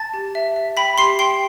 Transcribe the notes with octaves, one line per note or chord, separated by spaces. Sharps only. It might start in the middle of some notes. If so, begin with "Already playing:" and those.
Already playing: A5 A6
G4
E5
E5
G5 B5 B6
G4 C6 C7
G5 C6 C7